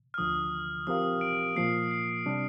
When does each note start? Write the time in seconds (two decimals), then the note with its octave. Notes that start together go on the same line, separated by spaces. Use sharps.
0.14 F6
0.18 D2 D3 F3 D#6
0.87 F3 C4 G4 A#4 F5 D#6
1.21 D7
1.56 A#2 F3 A#3 C7
1.91 C7
2.26 C3 G3 D4